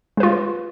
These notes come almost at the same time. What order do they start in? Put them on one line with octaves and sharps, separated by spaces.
G#3 B4 F4